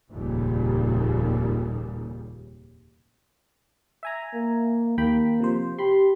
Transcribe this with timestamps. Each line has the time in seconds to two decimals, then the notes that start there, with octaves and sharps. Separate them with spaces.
0.12 F1 D#2 A#2 C#3 G3
4.03 E5 G#5 A#5
4.34 A#3
4.98 D#2 A#3 G5 B5
5.40 C3 F3 C5
5.79 G4 B5 C6